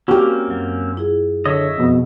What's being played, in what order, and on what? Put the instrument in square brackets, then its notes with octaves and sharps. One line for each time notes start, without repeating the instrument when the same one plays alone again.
[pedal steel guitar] A#3 C4 C#4 [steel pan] F#4 G4
[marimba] F#2 F#3
E4 F4 G#4
[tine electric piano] D3 C#5 [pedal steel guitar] D#5 E5 [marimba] C#6
[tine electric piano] F2 B2